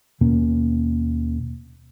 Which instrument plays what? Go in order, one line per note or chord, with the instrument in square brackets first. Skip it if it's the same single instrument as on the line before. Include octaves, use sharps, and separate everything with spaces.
[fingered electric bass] D#2 B2 A#3 C#4